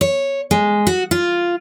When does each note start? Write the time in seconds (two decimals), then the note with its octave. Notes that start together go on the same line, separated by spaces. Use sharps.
0.01 C#5
0.51 G#3
0.87 F#4
1.11 F4